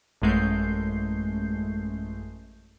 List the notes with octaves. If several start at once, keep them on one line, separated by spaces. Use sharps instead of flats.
A1 F#2 G#3 A3 G6 C7